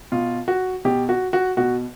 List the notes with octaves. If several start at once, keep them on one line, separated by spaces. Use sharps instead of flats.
B2 F4
F#4
B2 G4
F#4
F#4
B2 F#4